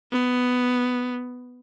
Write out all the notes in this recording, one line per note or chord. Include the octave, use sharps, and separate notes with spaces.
B3